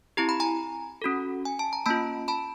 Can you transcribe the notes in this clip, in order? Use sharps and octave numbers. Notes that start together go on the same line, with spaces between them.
C4 E4 G4 A#5
B5
G#5 A#5
C#4 F#4 A4
G#5
A5
A#5
A#3 C#4 F4 A5 B5
A5 B5